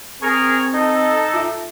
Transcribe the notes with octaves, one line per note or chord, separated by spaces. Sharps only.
C4 G#4 A#4 G#5 C#6
D#4 A4 D#5
F4 E5